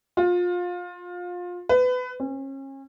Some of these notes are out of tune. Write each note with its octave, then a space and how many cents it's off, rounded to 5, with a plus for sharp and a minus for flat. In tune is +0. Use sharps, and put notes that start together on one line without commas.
F4 +25
B4 +25
C#4 -35